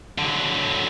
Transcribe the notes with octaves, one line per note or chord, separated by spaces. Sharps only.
D3 F#3